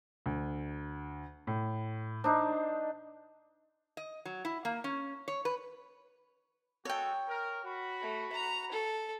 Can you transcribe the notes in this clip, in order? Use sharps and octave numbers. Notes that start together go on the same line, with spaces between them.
D2
A2
D4 D#4 C5
D#5
F#3
E4
A#3
C#4
C#5
B4
G#3 F#4 A4 C#5 G5
A#4
F#4 B5
A3
A#5
A4